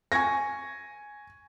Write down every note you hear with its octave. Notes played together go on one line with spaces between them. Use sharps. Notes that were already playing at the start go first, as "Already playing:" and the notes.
G#5 C#6 G#6 A#6